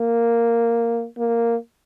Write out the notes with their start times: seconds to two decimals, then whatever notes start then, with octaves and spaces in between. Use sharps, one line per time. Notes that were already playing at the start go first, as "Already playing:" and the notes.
Already playing: A#3
1.18 A#3